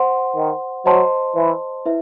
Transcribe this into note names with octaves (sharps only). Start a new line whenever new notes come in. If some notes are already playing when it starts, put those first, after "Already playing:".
Already playing: C5 F#5 C6
D#3
F#3 C5 D#5 A5 C6
E3
E4 B4 E5